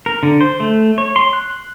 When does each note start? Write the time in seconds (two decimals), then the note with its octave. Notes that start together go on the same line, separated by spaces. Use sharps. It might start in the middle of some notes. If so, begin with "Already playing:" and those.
0.06 A#4
0.23 D3
0.41 C5
0.60 A3
0.98 C#5
1.16 C6
1.33 F#6